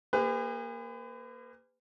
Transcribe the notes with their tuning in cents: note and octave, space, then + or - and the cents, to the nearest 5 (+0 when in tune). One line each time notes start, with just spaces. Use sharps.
A#3 +0 G#4 -40 B4 +40